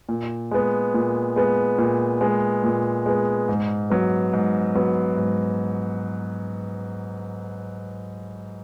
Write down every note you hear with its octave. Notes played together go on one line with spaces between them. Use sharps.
A#2
G#3 B3
A#2
G#3 B3
A#2
G#3 B3
A#2
G#3 B3
G#2
F#3 B3
G#2
F#3 B3
G#2